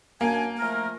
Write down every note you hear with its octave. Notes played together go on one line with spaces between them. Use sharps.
F#2 A#3 D4 G#5
F3 A3 A#4